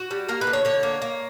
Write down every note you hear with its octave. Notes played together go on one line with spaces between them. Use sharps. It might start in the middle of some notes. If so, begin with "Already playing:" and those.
Already playing: F#4
G3
A#3 A#4
B4
D3
C#5
D3 C#5
A#3
A#3